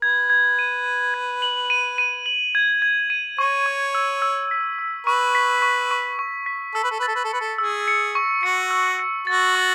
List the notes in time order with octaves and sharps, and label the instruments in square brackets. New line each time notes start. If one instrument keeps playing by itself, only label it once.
[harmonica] B4 [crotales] G#6
[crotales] G#6
D#7
D#7
G#6
F#7
D#7
D#7
F#7
G#6
G#6
D#7
[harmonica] C#5 [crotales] C#6
[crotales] C#6
E6
E6
B6
E6
[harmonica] B4 [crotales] C#6
[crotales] B6
C#6
C#6
C#6
B6
[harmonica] A4 [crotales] E6
[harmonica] B4
A4
[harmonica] B4 [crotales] A6
[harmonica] A4
B4
A4
[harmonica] B4 [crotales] C#7
[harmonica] A4
[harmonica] G#4 [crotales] E6
[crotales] C#7
C#6
[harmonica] F#4 [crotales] C#7
[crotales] E6
C#7
[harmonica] F#4 [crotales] A6
[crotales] C#6